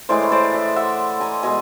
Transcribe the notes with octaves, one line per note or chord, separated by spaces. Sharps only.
A2 E3 G#3 C5 D5
C#5
C5 D5
D5 E5
E5 F#5
G#5 A#5
B2 G#3 G#5 A#5